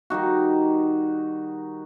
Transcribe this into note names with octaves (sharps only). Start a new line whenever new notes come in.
D#3 G3 D#4 F#4